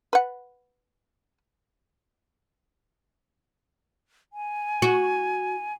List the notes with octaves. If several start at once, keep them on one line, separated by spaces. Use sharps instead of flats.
B4 F#5
G#5
F#4